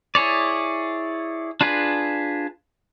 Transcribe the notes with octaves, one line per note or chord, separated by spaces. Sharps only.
E4 G#4 C#5 D5
D4 F4 G#4 B4